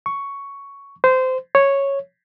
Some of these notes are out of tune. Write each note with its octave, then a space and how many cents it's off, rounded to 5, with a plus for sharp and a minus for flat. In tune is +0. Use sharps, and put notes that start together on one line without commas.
C#6 +5
C5 -20
C#5 -5